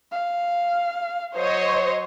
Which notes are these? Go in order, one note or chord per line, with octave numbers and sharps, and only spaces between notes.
F5
F#3 C5 C#5 D#5